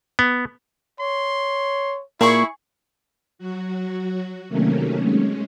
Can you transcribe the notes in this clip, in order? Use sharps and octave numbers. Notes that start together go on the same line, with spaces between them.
B3
C#5 C6
A#2 E4 G#4 C#6
F#3 F#4
C3 D#3 F#3 A3 A#3 C#4
G#3 C#4